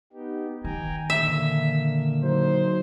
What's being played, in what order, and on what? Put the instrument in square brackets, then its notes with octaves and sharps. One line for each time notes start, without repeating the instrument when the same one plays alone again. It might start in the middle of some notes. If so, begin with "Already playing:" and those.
[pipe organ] B3 D#4 G4
[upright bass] D#3 [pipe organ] G5 G#5 A#5
[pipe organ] A#2 D3 A#3 [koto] E5
[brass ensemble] F#3 D#4 C5